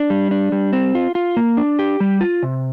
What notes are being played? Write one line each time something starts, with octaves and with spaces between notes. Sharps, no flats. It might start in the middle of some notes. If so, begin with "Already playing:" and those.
Already playing: D4
G3
D4
G3
C4
F4
F4
A#3
D4
G4
G3
F4
C3